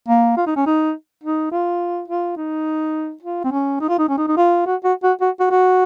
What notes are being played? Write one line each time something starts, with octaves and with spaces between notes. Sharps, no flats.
A#3
F4
D#4
C#4
D#4
D#4
F4
F4
D#4
F4
C4
C#4
D#4
F4
D#4
C#4
D#4
D#4
F4
F#4
F#4
F#4
F#4
F#4
F#4